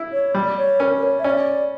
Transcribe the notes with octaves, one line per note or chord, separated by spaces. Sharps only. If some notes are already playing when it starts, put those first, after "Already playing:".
Already playing: E4
C#5
G3 D5
C#5
C#4 A#4
A#4
C#5
E5
C#4 D5